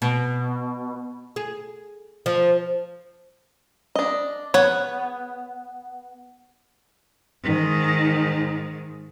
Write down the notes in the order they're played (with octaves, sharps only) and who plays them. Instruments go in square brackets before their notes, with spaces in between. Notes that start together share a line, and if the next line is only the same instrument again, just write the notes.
[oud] B2
G#4
F3
[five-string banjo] D4 D#5
[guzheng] B3 [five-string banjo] C#5
[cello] G#2 D#3